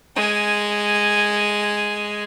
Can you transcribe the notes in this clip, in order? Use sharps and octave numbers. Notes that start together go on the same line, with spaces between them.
G#3 G#5